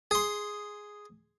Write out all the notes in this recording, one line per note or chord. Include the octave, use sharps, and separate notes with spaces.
G#4 C6